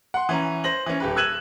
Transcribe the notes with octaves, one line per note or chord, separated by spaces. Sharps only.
F#5 C6
E3 C#4 A#5
C5 A#6 F#7
E3 C#4
D#1 G4 B4
E6 F#6 G#6 D#7 E7 F#7